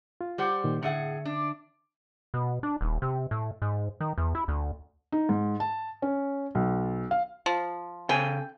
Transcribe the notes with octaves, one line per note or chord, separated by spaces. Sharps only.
F4
G3 C5 F#5
A#2 D#3
A2 D3 G#4 E5 F#5
D4
B2
D4
D#1
C3
A2
G#2
D#3
E2
E4
D2
D#4
G#2
A5
C#4
B1
F5
F3
C#3 A4 G5 G#5